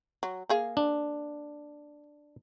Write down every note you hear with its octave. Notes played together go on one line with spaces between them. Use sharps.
F#3
A#3 G#4 F5
D4